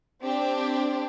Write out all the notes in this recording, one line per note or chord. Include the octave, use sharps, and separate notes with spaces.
C4 D4 G4